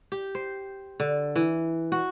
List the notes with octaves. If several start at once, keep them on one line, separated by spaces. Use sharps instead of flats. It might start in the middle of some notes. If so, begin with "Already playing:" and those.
G4
C5
D3
E3
F#4